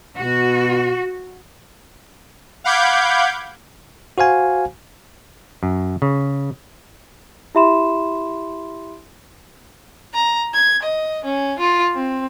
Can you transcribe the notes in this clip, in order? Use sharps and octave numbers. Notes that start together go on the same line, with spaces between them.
B2 F#4
F5 F#5 B5 D6 G6 G#6
F#4 C5 F5 G#5
F#2
C#3
E4 G4 E5 B5 C6 E7
A#5
G#6
D#5
C#4
F4
C4